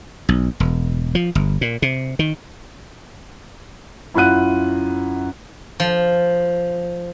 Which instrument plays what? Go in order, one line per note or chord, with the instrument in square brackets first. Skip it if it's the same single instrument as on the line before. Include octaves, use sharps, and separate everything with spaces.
[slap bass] B1
E1
F3
G1
A#2
C3
D#3
[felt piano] F#2 E4 F4 F#5 F#6 D#7
[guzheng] F3